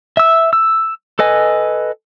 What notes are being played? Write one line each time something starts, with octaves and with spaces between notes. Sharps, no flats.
E5 E6
E6
A4 B4 D#5 G#5